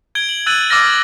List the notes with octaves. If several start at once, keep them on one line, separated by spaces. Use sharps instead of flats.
G#6 D7 G7
F#7
E6 F#6 A6 D#7 F#7
D6 E6 F6 A6 A#6